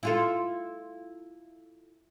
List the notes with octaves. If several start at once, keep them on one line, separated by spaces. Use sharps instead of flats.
E4 F4 A4